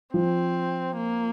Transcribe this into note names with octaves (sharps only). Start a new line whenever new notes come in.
F3 C4
A#3